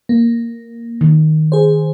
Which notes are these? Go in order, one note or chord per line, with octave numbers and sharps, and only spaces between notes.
A#3
D#3
G#4 C5